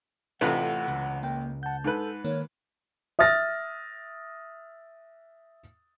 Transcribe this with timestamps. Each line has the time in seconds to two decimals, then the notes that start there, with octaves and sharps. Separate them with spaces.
0.41 A1 C3 A3 F4 B4 F#5
0.88 C#2
1.23 A#3 G5
1.63 F#5 A5 G6
1.84 G#2 A4 B4
2.25 D#3 A#3 C#5
3.19 E5 D#6 F6 A6 A#6